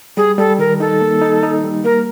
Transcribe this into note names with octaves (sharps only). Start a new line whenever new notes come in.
G3 G#4
G3 A4
D#3 A#4
D#4 A4
A#3
D#4
D#4
G3
A#3 A#4